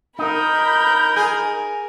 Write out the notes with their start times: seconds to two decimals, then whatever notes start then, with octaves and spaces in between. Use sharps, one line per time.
0.19 D#4 A#4 B5 G6
1.16 G#4